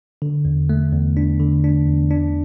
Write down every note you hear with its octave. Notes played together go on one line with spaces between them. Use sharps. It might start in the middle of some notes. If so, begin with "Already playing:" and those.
D3
E2
A3
E2
D4
D3
D4
E2
D4